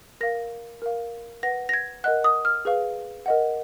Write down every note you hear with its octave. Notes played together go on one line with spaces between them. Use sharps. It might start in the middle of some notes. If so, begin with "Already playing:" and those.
A#4 F5 A#6
A#4 F5
B4 F#5 A#6
A#6
G#6
A#4 D#5 F#5 F#6
D#6
F6
G#4 B4 F5
A#4 D#5 F#5